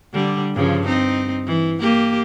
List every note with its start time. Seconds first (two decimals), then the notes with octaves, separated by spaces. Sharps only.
0.14 D3 G3
0.55 G2 C#3 F3
0.87 C4 D#4
1.47 E3
1.80 A#3 G4